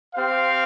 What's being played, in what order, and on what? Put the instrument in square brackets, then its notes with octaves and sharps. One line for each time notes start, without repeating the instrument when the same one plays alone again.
[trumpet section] C4 G4 C5 F5